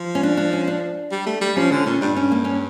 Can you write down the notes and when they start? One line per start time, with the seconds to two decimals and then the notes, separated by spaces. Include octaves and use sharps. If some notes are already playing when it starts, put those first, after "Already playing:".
Already playing: F3
0.15 C#4
0.23 D4
0.37 D4
0.53 C#4
0.68 D4
1.12 G3
1.26 A3
1.41 G3
1.57 F3 C#4
1.72 D3 C#4
1.86 A#2 C#4
2.01 G2 D4
2.16 C#4
2.31 A#3
2.45 C#4